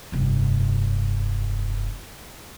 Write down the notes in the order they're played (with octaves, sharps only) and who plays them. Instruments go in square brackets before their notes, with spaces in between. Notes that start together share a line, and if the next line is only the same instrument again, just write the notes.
[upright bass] F1 G2